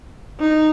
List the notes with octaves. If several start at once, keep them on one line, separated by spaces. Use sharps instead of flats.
D#4